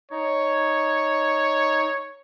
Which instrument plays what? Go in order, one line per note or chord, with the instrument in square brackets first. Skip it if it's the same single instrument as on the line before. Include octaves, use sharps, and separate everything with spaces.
[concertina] D#4 [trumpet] C#5